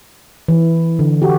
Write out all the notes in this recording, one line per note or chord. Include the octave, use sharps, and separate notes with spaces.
E3
D3
F#4 G4